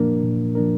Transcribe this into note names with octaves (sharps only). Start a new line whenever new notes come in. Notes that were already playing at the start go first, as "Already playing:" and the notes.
Already playing: A#2 F3 A#3 D4 A#4
A#2
F3 A#3 D4 A#4